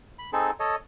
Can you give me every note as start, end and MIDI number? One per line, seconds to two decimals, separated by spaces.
0.19 0.31 83
0.33 0.51 60
0.33 0.51 63
0.33 0.51 68
0.33 0.51 69
0.60 0.76 69
0.60 0.76 73
0.60 0.76 75